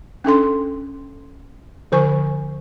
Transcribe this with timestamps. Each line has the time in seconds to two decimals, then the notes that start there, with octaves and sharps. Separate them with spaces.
0.24 C#4 D4 A4 C6
1.92 D3 F3 C5 G#5 C#6